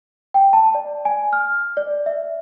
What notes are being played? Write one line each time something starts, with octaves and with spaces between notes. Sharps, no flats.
G5
A5
D5
G#5
F6
D5
E5